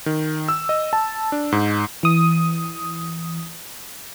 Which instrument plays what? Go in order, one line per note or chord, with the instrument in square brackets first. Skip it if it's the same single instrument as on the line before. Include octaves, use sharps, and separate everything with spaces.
[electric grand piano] D#3
E6
D#5
A5
D4
G#2
[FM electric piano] E3 D#6